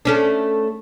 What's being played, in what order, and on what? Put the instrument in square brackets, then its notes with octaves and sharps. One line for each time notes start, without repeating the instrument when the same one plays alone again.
[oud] A3 C#4 D4